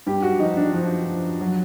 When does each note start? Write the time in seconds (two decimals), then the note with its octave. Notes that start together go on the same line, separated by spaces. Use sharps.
0.06 G2 G4
0.23 F#4
0.40 F3 D#4
0.57 D4
0.73 F3
1.07 F3
1.41 F#3